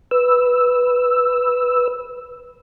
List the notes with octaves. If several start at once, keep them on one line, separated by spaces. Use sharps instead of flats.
B4 E6